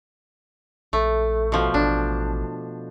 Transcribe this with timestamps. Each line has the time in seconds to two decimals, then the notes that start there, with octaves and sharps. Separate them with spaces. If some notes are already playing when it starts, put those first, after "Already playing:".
0.93 A#1 A3
1.52 B2 F3
1.74 A1 D4